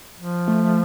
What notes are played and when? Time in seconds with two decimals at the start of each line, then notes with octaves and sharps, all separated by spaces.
0.18 F3
0.48 A3